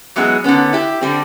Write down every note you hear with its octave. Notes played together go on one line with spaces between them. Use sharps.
E3 F#3 G#3 B3 G#4
D3 D#3 B3 C#4
E4 G4
D3 G3 C4